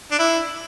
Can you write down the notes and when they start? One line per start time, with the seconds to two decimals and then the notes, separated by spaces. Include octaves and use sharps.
0.11 D4
0.19 E4